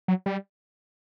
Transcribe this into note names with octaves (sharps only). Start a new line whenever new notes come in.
F#3
G3